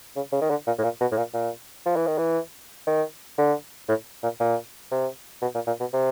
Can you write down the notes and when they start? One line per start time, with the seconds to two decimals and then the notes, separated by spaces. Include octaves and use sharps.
0.16 C#3
0.32 C#3
0.41 D#3
0.50 D3
0.67 A#2
0.79 A2
0.83 A#2
1.01 B2
1.12 A2
1.17 A#2
1.34 A#2
1.86 F3
1.96 E3
2.07 D#3
2.18 E3
2.87 D#3
3.38 D3
3.89 A2
4.23 A#2
4.40 A#2
4.92 C3
5.42 B2
5.55 A#2
5.67 A#2
5.80 B2
5.93 C3